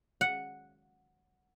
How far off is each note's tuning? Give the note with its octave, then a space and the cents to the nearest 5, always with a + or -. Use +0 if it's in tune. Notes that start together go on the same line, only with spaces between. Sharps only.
F#5 -5